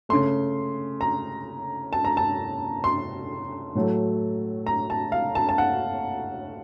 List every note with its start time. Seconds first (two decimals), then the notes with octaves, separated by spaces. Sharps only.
0.09 C#3 A3 C6
1.01 A#5
1.93 A5
2.05 A#5
2.17 A5
2.84 C6
3.75 A2 F#3 A3
4.67 A#5
4.90 A5
5.12 F5
5.35 A5
5.49 A5
5.58 F#5